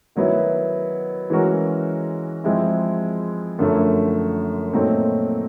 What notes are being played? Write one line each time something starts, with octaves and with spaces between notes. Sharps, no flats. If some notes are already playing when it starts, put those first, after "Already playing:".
D#3 F#3 B3 E4
E3 G#3 C#4 F#4 A#4
F3 G#3 C4 E4
F#2 D3 F3 A3
A#2 F#3 A3 C4 D#4